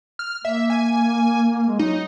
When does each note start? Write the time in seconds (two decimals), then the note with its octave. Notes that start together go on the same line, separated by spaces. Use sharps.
0.19 F6
0.45 A#3 E5
0.70 G#5
1.68 G#3
1.79 F#3 D#4